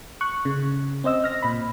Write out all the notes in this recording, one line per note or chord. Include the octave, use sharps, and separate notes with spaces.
C#6 F#6
C#3
C4 C5 D#5 E6
F6 A#6
A#2 B5